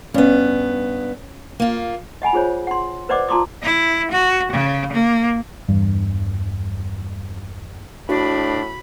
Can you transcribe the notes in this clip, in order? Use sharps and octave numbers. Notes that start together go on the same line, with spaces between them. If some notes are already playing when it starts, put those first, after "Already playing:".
G2 B3 C#4
A#3 F4
D#5 F#5 G#5 B5
F4 G#4 C5 C#5
F#5 C6
B4 C5 D5 D#5 F#5 D6
F4 A5 A#5 C6 D6 D#6
E4
F#4
C#3
A#3
E2 G2
A2 D4 F#4 B5